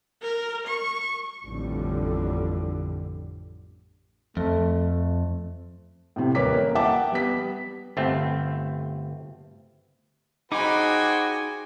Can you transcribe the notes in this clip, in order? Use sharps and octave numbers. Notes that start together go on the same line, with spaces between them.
A#4
C#6
A1 F2 A2 D3 G3
F2 A3
A2 C3
D#1 A#4 B4 C#5 D6 B6
A#3
E5 F#5 G5 A5 D6
G3 B3 B6
G1 A3 C4
D#4 F#4 G#4 C5 G5 G#5 B5 D6